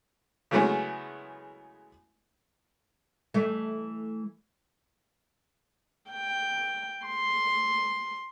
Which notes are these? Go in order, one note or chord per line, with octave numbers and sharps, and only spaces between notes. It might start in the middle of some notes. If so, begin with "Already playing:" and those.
C#3 E3 F#3 G#3 A3 B3
E3 A3
G5
C6